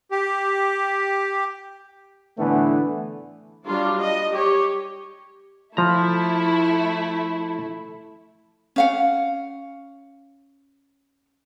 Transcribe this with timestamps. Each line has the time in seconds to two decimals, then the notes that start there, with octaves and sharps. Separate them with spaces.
0.11 G4
2.38 A2 D3 E3 A3 B3
3.67 F#3 G3 D4 F4
4.01 D#5
4.33 G4 C#5
5.77 F3 A3 E4 A#5
8.76 C#4 F5 F#5